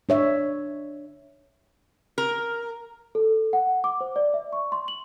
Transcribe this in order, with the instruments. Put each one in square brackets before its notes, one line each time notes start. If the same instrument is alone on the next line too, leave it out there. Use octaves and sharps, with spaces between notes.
[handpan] D4 C#5 E5
[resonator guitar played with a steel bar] A#4
[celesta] A4
F#5
D6
C5
D5
E5
C#6
C6
F#7